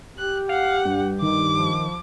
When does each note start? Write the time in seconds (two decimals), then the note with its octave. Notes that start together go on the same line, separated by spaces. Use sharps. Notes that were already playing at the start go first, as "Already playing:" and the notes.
0.18 G4 F#6
0.49 F5 F#5
0.85 G2
1.22 D#3 D6
1.54 F3